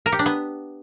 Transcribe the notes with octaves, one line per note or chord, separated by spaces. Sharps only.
A#4
G4
D4
B3